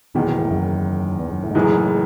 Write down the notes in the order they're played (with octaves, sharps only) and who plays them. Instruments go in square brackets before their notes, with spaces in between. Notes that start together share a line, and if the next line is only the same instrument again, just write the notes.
[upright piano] F#1 E2 D#3 [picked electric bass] B2
[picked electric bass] B2
A2
F#2
E2
F#2
A2
G#2
[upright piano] F#1 F#2 E3 G#3 D#4 [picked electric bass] A2